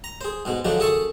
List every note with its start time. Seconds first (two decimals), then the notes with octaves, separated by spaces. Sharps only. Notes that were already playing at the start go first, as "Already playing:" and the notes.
0.04 A#5
0.21 G#4 C5
0.45 G#2 B2 G#3
0.65 D3 F3 F#3 G#3 D4 D#4
0.79 F#2 G#4 A4 A5 C#6 D#6